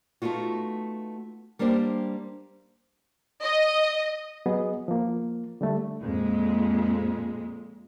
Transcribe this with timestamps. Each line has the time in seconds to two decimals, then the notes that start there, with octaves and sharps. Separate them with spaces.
0.22 A3 B3 D#4 F4 F#4
1.59 G3 A#3 D4 G4 C5
3.42 D#5
4.46 F#3 B3 G#4 D#5
4.88 F3 A#3
5.61 D3 G3 A3
6.01 F2 A#2 G#3